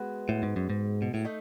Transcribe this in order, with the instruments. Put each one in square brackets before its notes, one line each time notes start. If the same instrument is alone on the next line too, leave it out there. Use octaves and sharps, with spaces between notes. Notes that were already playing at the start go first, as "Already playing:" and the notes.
Already playing: [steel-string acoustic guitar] G#3 B3 F#4 B4
[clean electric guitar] A2
G#2
F#2
G#2
B2
A2
[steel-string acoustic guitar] A3 D#4